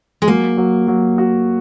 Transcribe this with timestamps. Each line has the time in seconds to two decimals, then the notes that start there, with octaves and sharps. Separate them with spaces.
0.22 G#3
0.27 F#3 A#3
0.58 F#3
0.88 F#3
1.18 F#4